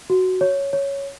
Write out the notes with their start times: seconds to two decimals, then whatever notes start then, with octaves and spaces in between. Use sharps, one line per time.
0.10 F#4
0.41 C#5
0.73 C#5